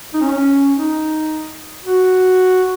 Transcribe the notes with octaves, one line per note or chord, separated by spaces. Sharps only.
D#4
C#4
D#4
F#4